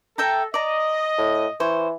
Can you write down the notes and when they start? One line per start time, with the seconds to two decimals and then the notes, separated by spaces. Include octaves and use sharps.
0.18 A4 E5 G5 A#5
0.54 D5 D#5 A#5
1.18 A2
1.60 E3 C5 C#5